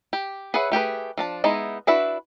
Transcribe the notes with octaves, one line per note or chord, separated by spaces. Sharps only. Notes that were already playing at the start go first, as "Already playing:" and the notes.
G4
G#4 B4 C#5 E5 F#5
A3 G4 G#4 B4
F3 D4 A5
G#3 B3 D#4 E4
D4 E4 F#4 B4 E5